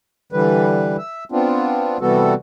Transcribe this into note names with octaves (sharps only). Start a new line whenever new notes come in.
D3 E3 G3 B4
E5
B3 C4 D4 F4
C3 E3 G3 B3 F#4 A4